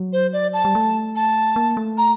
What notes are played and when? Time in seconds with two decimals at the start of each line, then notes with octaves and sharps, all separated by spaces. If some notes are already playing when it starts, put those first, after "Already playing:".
Already playing: F#3
0.13 C5
0.33 D5
0.53 A5
0.65 G3
0.75 A3
1.16 A5
1.56 A#3
1.77 A3
1.98 A#5